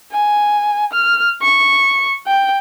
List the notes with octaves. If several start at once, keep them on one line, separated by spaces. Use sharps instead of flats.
G#5
F6
C#6
G5